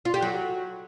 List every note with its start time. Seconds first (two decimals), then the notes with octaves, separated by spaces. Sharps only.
0.05 F4
0.14 G4
0.22 F#3